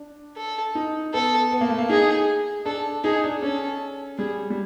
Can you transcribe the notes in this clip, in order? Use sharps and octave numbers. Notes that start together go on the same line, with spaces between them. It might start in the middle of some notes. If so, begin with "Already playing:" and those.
Already playing: D4
A4
D#4
B3 A4
B3
A#3
A3
A#3
D#4 G#4
D4 A4
D#4 G#4
D4
C#4 A4
G3 G#4
G3